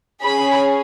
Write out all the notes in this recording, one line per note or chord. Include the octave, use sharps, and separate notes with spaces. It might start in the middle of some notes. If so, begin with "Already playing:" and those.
C#4 G#4 B5